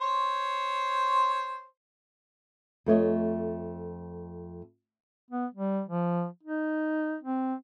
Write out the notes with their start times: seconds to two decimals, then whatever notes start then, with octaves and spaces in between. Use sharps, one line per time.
0.01 C5 C#5
2.86 F2 A3 C#5 D#5
5.31 B3
5.54 G3
5.88 F3
6.43 D#4
7.23 C4